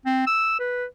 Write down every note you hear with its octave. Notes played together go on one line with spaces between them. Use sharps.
C4
E6
B4